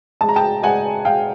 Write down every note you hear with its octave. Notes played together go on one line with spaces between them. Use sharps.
G#3 A5
A#5
G5 A5
G#3 F#5 G#5
G#3 F5 G5